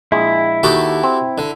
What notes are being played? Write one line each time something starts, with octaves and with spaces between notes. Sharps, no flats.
A#1 G#3 E4
D#2 F#4 G4 A4
C4
D3